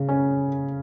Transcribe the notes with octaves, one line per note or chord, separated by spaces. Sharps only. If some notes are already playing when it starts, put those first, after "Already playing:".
Already playing: C#3
C#4